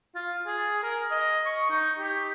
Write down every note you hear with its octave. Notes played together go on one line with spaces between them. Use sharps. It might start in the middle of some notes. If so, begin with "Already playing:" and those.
F4
G#4
A#4
D#5
C#6
D#4
G4